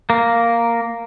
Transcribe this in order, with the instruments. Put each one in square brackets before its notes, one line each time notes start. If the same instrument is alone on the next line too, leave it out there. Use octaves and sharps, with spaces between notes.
[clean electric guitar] A#3